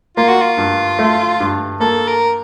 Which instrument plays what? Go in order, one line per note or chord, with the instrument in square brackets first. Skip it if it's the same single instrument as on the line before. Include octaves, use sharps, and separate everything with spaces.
[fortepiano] A#3 [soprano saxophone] F4
[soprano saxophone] F#4
F4
[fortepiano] G2
A3
G2
[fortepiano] A#3 [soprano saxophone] A4
[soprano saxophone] A#4